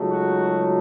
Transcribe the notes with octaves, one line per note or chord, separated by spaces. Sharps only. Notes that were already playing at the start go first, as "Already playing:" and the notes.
Already playing: C#2 C#3 F#3 A3 D#4
F#4